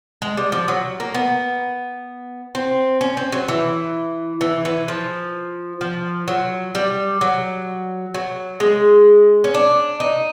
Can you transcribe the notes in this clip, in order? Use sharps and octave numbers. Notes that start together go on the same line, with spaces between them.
G#3
G3
F3
F#3
A#3
B3
C4
C#4
C4
F#3
E3
E3
E3
F3
F3
F#3
G3
F#3
F#3
G#3
C#4
D4
D#4